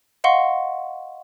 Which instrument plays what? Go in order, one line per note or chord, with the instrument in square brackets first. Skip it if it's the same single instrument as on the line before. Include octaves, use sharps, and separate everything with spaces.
[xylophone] D#5 F5 F#5 C6 C#6